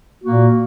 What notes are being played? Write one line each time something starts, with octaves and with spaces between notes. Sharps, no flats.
A#2 A#3 F#4